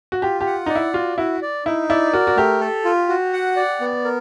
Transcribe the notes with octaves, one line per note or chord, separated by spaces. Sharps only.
F#4
F4 G4
G4
F#5
D#4 D5
E4
F4 F#4
E4 F#4
D5
D#4 E4
E4 D5
F#4 A#4
F#4
A3 G4
A4
F4
F#4
F#5
D5
B3
A#4